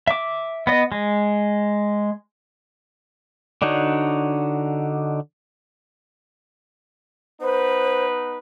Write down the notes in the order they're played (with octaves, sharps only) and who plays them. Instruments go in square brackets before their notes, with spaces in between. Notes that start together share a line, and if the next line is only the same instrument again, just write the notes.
[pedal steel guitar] E5 D6
B3 D#5
G#3
D3 D4 D#4 F#4 C#5
[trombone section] B3 D#4 B4 [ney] C5